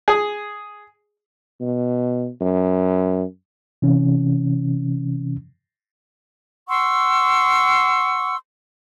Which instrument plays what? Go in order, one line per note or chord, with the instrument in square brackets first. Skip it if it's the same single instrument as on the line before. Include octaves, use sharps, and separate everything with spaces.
[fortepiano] G#4
[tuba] B2
F#2
[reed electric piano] C3 E3 C#4
[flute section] F#5 C6 C#6 E6